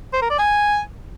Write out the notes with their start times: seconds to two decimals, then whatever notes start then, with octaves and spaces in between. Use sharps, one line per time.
0.13 C5
0.22 A#4
0.30 D5
0.39 G#5